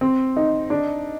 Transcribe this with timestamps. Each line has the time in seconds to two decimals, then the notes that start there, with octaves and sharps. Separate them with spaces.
0.01 C4
0.37 D#4
0.70 D4